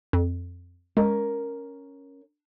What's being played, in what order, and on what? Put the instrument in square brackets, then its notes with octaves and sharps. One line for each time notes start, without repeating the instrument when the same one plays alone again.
[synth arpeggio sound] F2
[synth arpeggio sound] G#3 [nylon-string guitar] C#4 A#4